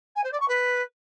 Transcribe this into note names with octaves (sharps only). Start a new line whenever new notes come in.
G#5
C5
D5
C#6
B4